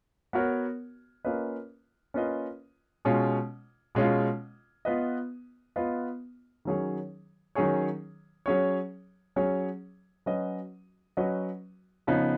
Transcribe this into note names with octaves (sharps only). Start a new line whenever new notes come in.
B3 F#4 A#4 C#5
A#3 C#4 F4 B4 D#5
A#3 C#4 F4 B4 D#5
B2 G#3 C#4 F4
B2 G#3 C#4 F4
B3 F4 B4 D#5
B3 F4 B4 D#5
D#3 F#3 C#4 G#4 C#5
D#3 F#3 C#4 G#4 C#5
F#3 C#4 G#4 C#5
F#3 C#4 G#4 C#5
F#3 C#4 F#4 B4 D#5
F#3 C#4 F#4 B4 D#5
C#3 F3 B3 D#4